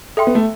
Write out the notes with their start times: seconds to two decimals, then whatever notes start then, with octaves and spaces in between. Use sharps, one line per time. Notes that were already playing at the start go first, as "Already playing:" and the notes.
0.17 A4 E5 G5 C6
0.27 B3
0.35 A3